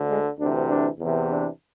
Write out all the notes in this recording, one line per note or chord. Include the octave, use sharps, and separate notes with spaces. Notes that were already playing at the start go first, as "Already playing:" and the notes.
Already playing: D2 D3
G#3
D2 C3 E3 D4
D4
E2 C3 E3
D4